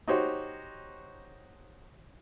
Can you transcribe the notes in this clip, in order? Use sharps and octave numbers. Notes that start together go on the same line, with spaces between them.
D#4 F#4 G4 C5 C#5